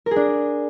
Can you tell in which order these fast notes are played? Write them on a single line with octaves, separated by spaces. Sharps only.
A#4 G#4 D4